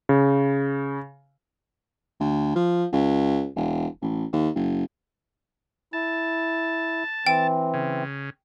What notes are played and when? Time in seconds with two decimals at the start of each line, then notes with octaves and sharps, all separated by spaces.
0.09 C#3
2.20 D2
2.55 F3
2.92 C#2
3.56 E1
4.01 A1
4.33 D#2
4.55 F#1
5.93 E4 A5
7.27 E3 C4 G5
7.74 C#3